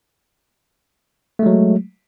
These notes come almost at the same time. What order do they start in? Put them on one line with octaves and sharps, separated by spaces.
A3 G#3 F#3